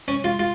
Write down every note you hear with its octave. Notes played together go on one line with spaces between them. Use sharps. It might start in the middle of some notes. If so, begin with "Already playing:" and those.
C#4
F4
F4